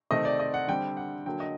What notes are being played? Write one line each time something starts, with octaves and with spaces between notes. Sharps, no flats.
C3 D#3 A3 C4 D#5
D5
D#5
F#5
D3 G3 C4 G5
F#5
D3 F#3 A#3 G5
D#5